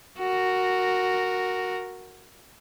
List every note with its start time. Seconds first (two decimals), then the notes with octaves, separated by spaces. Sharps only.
0.19 F#4 A#4